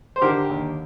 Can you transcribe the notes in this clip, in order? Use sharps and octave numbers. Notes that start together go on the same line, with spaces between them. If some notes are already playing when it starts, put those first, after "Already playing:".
C5
D3 G4 A#4
D#2